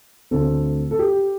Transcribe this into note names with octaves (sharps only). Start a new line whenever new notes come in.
D2 D3 A3 C4 A4
A4
G4